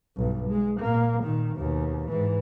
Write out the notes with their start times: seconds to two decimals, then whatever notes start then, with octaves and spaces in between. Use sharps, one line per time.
0.16 B1 G2
0.49 G#3
0.80 A#2 A#3
1.24 A#2 D#3
1.56 D#2 B2
2.08 G#2 E3